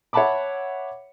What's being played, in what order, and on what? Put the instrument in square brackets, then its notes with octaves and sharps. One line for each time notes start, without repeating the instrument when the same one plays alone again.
[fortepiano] C#5 E5 F#5 A5 B5 D6